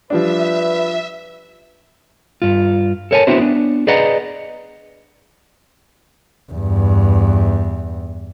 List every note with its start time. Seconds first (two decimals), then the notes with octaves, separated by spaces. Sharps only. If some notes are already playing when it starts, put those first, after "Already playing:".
0.10 F3 G3 D4 B4 E5
2.42 G2 F4
3.11 A4 A#4 C#5 E5 G#5 A5
3.27 B3 C4 D4 E4 F#4 C5
3.39 B3 D4
3.87 G#4 B4 D5 D#5 F#5 A#5
6.52 E2 G2